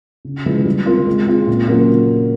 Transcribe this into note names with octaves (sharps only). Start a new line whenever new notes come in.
C#3
F3 G#3 B3 E4
G3
C4 F4 A#4
G#3
C4 F4 G#4
A#2
F#3 A#3 C#4 F4